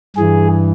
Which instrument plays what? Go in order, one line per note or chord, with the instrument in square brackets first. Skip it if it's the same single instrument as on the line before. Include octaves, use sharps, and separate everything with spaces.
[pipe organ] G2 E3 G#4